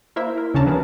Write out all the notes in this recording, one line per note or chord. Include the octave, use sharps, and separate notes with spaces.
A#3 E4 A#4 C5 E5
A#4
D#2 C#3 C#4 D4 A5 A#5
E3 F#3 B3 E4 G#4 A#4